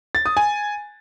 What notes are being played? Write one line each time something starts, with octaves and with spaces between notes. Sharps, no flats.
A6
D#6
G#5